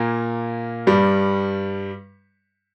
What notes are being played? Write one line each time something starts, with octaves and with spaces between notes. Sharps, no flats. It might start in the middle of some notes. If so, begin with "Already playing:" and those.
Already playing: A#2 A#3
G2 G3